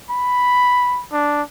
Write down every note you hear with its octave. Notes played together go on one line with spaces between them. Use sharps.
B5
D4